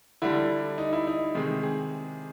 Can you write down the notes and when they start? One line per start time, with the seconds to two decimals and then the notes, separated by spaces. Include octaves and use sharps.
0.22 D3 G3 E4
0.78 D#4
0.93 E4
1.07 D#4
1.35 C3 D#3 G#3
1.63 G#4